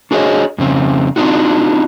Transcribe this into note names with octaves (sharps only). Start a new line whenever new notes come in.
D4 F#4 G#4 C5 C#5 D#5
F2 C#3 C4
C4 D4 D#4 F4 F#4